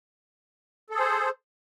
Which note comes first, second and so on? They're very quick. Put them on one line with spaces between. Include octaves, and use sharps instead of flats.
A4 G#4 C5